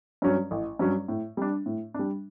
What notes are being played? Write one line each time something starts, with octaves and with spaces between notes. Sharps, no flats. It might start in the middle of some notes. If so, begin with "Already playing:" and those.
G2 F#3 C#4
A1
G2 F#3 C#4
A2
G3 D4
A2
G3 D4